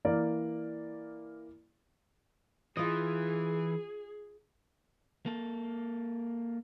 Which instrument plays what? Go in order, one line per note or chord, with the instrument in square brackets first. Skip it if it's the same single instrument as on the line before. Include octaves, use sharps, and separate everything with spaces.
[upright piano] E3 A#3 A#4 D5
[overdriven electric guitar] E3 [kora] F4 D#5 [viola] G#4
[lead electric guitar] A#3 A4